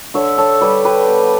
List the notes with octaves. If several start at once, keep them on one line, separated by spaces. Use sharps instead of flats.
D3 C#5 E5
A4 C#5
G3 G4 B4
G4 B4
B3